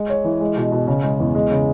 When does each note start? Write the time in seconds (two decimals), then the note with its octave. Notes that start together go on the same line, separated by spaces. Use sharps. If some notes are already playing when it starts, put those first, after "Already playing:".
Already playing: G#3
0.10 C#5
0.25 E3
0.41 G#3
0.57 B2
0.72 B2
0.87 C#3
1.03 G#3
1.20 E2
1.35 G#3
1.51 C#3